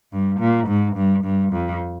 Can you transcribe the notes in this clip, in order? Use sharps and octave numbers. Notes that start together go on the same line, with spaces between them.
G2
A#2
G#2
G2
G2
F2